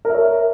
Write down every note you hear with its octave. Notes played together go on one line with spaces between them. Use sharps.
A#4 C#5 E5